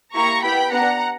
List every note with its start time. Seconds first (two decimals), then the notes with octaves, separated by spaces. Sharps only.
0.14 A#3 E4 G4 A#5 C#6
0.43 B3 E4 G4 G5 B5
0.71 B3 D4 G4 F#5 A#5